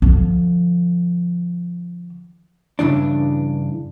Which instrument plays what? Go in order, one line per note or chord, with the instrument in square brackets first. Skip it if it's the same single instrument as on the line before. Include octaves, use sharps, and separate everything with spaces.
[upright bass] D3 F3
[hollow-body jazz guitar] G2 C#3 E3 D4